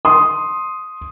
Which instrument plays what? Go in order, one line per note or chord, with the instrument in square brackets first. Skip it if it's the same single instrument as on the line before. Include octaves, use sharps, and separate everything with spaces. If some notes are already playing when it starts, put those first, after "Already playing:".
[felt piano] C6 D#6